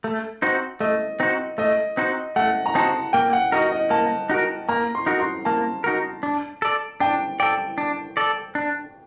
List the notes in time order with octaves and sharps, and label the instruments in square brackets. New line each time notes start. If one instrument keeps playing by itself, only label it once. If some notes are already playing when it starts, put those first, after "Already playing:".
[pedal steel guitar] A3
C4 D#4 F#4 C5
[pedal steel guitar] A3 [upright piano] D#5
[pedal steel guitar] C4 D#4 F#4 C5
[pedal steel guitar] A3 [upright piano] D#5
[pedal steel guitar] C4 D#4 F#4 C5
[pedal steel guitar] A3 [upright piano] F#5
[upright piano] A#5
[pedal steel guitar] C4 D#4 F#4 C5 [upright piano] A5
[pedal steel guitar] A#3 [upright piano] G5
[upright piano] F#5
[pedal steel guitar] D#4 F#4 A#4 [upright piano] D#5
[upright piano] D#5
[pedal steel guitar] A#3 [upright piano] A5
[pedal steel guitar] D#4 F#4 A#4
[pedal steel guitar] A#3 [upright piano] A#5
[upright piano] C6
[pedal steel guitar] D#4 F#4 A#4
[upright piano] C6
[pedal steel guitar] A#3 [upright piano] A5
[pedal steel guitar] D#4 F#4 A#4
D4
A4 D5
[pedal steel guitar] D4 [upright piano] G5
[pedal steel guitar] A4 D5 [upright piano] G5
[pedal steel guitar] D4
A4 D5
D4